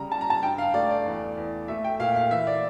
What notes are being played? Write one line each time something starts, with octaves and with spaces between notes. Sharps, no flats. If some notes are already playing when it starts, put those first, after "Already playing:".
Already playing: C#3 G3 A#5
G3 A5
A#5
A5
G2 G5
F5
A3 D5
D5
E2
E2
A3 E5
G5
A#2 F5
F5
E3 E5
D5